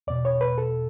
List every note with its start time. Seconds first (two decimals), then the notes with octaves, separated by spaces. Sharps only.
0.07 E2 B2 D5
0.25 C#5
0.41 B4
0.58 A4